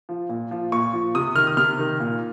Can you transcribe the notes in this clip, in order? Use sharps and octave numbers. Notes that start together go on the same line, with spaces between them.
F3
A#2
F3
A#2 C#6
F3
C3 D#6
D#3 F6
D#6
C3 F6
D#3
A#2